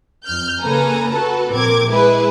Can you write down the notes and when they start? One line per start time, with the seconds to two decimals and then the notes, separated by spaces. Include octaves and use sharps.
0.25 F2 F6 G6
0.61 C#3 A#3 A4 B4 G#5 A#5
1.11 F#4 A4 B4 A5
1.51 A#1 C4 A#4 D6 G#6
1.89 G#3 E4 G#4 B4